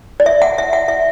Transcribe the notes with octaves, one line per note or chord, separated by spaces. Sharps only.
D5
E5
F#5
E5
F#5
E5